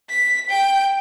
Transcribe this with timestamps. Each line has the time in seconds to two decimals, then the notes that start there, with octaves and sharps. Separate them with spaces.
0.10 B6
0.50 G5